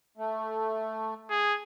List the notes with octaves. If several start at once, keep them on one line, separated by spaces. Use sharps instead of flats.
A3
G#4